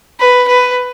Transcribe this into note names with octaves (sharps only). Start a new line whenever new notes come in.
B4
B4